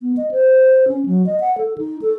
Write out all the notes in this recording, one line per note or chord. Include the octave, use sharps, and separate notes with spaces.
B3
D#5
C5
C#4
F#3
D#5
F#5
A4
D#4
A4